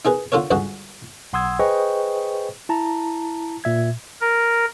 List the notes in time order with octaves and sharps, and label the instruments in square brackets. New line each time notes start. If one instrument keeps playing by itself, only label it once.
[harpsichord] D#4 G#4 A#4 B4
D3 F4 A4 A#4 C#5
C#2 G2 D3 F#4 D#5
[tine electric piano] B1 F#5 C6 D#6 E6 G#6
G#4 B4 C5 D#5 G5 C#6
E4 A5 A#5
A#2 E5 G#6
[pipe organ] A#4